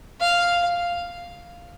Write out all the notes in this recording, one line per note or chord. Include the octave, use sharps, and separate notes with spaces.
F5